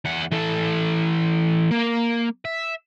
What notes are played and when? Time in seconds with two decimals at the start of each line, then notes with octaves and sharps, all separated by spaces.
0.05 E2 F#5
0.32 E3 A4
1.71 A#3
2.45 E5